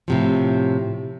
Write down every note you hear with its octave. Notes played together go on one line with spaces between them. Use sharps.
A2 C3 F3